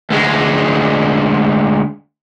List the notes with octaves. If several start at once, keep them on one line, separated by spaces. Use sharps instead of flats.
D2 G#3